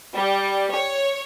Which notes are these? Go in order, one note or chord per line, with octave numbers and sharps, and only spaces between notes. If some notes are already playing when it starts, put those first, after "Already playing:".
G3
C#5